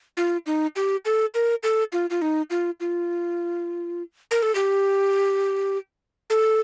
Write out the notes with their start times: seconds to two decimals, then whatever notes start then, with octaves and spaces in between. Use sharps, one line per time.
0.17 F4
0.46 D#4
0.76 G4
1.05 A4
1.34 A#4
1.63 A4
1.92 F4
2.10 F4
2.22 D#4
2.50 F4
2.80 F4
4.31 A#4
4.42 A4
4.55 G4
6.30 A4